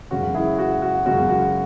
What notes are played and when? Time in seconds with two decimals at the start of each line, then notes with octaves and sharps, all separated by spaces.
0.11 F#2 C#3 G#3 C#4 F#4
0.34 E4 G#4
0.58 F#4
0.82 F#4
1.06 F#2 C#3 G#3 C#4 F#4
1.29 F#4